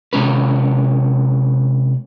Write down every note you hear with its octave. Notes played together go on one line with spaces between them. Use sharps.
C3 G#3 C#4 B4